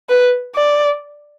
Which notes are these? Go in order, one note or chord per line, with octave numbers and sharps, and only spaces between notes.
B4
D5